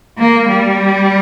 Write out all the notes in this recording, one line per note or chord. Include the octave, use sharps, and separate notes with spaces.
A#3
G3